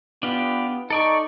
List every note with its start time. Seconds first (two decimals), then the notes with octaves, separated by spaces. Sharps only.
0.23 B3 D4 F4 G4
0.90 D#4 A4 D5 C#6